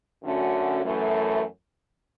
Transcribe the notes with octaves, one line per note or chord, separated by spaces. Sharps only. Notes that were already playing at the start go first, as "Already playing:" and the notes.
F#2 D3 A3 C#4 F#4
F#2 E3 A3